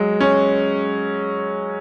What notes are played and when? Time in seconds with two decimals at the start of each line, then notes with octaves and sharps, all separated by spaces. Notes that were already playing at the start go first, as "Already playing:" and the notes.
Already playing: F#3 G#3
0.20 C#4